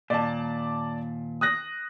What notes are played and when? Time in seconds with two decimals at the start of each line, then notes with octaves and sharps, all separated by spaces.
0.10 D#2 A#2 D5 A5
1.41 D#6 F#6 A#6